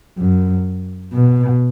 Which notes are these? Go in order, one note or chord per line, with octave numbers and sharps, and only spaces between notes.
F#2
B2